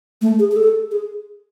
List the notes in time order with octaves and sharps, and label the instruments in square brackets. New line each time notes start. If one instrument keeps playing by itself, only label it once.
[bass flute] A3
G#4
G#4
A4
G#4